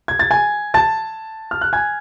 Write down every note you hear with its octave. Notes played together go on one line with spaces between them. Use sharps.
G#6
A6
G#5 G#6
A5 A6
F6
F#6
G#5 G#6